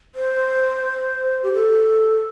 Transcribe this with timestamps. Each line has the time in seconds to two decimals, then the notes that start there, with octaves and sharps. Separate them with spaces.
0.15 C5
1.43 G4
1.54 A4